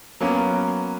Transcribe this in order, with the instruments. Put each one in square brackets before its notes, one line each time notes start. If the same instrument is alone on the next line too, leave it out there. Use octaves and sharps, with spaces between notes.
[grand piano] F#3 A#3 B3 C#4